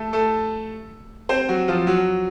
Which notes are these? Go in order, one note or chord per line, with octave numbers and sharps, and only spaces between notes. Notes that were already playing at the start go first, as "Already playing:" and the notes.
Already playing: A3 A4
A3 A4
C4 C5
F#3 F#4
F3 F4
F#3 F#4